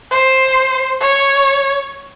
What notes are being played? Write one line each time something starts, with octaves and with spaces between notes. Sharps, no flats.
C5
C#5